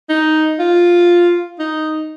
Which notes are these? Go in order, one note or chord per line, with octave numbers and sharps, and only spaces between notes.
D#4
F4
D#4